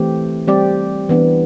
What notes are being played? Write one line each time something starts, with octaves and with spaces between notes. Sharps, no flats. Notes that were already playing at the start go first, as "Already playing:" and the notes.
Already playing: E3 A3 C4 G4
G3 C4 G4 D5
E3 B3 D4